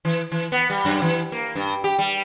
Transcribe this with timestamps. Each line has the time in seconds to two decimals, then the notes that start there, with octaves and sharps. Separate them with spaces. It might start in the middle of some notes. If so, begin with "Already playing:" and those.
0.05 E3
0.31 E3
0.52 B3
0.70 G3
0.85 F#2
1.02 E3
1.32 A#3
1.55 G2
1.84 G4
1.98 G3